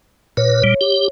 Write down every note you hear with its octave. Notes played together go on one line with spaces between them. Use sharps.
A#2 B4 C#5
A#2 G3
G4